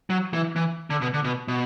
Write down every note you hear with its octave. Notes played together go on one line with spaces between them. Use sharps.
F#3
E3
E3
D3
B2
D3
B2
B2